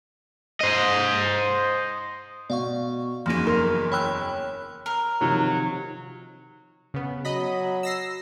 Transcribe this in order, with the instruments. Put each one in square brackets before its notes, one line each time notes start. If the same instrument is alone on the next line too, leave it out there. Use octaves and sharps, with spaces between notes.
[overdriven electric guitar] C5 D#5
[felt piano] B2 [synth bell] D5 F5 C#6
[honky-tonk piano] F#1 E2 [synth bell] F3 A#3 D#4
[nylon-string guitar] A#4 [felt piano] C6 F6
[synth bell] C#5 G5 F#6 [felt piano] B5 E6
[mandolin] A#4
[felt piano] C3 D#3 F3 [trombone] F#3
[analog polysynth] C#3 B3
[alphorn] F#3 [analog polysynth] D#5 B5
[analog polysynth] E6 A#6 C7